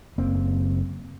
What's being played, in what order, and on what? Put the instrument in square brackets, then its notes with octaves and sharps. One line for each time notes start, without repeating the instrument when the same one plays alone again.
[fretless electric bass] F#1 A#3 C4